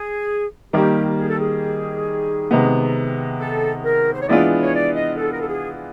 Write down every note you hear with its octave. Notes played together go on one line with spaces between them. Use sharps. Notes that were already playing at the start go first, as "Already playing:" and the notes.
Already playing: G#4
D#3 G3 A#3 G4
G#4
A4
G#4
C3 D#3 G#3 B3
A4
A#4
C5
C#5
E3 G#3 B3 D4 F4 D5
C#5
D5
D#5
A4
A#4
A4
G#4